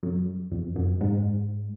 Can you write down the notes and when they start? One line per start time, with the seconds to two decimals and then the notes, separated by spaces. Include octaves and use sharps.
0.03 F#2
0.52 F2
0.76 F#2
1.01 G#2